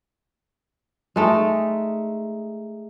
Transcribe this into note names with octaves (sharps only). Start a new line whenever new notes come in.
G#3 A3 D#4